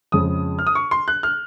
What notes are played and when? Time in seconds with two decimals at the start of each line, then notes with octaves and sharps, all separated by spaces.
0.12 F2 C#3 G#3 D#6
0.59 F6
0.67 D#6
0.75 C#6
0.91 C6
1.08 F#6
1.23 F6